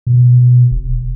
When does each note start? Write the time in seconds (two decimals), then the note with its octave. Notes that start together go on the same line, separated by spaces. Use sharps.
0.07 B2
0.71 D#1